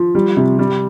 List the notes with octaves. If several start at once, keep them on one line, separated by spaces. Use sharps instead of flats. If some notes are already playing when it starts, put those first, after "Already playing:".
Already playing: F3
G3
C3
G3